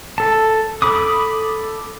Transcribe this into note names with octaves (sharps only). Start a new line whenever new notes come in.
A4 A5
A4 B5 D6 D#6